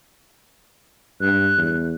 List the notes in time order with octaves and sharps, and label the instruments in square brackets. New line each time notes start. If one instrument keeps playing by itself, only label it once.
[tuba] G2 [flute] F#6
[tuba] E2